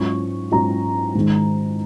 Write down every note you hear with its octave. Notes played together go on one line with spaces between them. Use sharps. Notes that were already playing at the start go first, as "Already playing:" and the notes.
Already playing: G#2 F#3 C#4 F4 C#6
G#2 F#3 C#4 F4 A#5
G#2 D#3 G#3 D#4